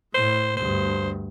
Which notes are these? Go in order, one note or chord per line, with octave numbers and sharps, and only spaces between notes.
A2 C5
D2 G2 C5